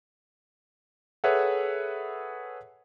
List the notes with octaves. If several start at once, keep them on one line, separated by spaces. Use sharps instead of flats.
G#4 A4 B4 C#5 E5 F#5